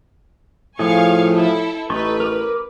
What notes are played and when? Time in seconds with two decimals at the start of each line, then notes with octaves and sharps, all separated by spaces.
0.79 A2 F3 G#4 F5 G#5 C#6
1.34 E4 A4 E5
1.90 A1 D#4 A4 B4 C#6
2.20 A#4 D6